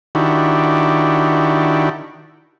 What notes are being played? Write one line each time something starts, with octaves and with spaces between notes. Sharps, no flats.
D#3 D4 E4 F#4 G4